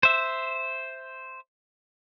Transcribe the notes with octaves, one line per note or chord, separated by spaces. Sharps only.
C5 E5